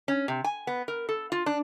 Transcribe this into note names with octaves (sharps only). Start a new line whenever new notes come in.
C#4
C3
G#5
B3
A#4
A4
F4
D4